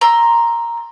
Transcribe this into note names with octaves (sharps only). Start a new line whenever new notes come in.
A#5 C6 E6